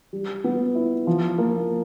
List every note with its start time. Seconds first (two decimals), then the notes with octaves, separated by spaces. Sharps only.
0.13 G3
0.44 B3
0.75 E4
1.07 F3
1.38 A#3